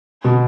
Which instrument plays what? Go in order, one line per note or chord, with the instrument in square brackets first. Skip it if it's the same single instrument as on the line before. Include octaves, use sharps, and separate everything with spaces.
[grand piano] B2